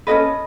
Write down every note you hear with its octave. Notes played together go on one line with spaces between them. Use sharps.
C#4 F#4 A4 B4 D#5